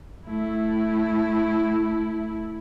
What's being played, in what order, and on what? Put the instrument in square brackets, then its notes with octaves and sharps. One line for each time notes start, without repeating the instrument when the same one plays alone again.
[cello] A3 E4